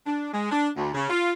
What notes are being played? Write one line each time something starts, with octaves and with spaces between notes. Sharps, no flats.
D4
G#3
D4
D2
C#3
F4